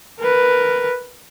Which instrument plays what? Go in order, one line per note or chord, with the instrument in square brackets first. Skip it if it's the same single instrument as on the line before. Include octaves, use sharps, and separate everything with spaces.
[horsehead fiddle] A#4 B4